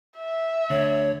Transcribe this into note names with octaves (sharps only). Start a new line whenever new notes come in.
E5
D2 D3 C#5